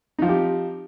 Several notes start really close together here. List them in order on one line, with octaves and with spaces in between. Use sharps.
D#4 F3 C4 G4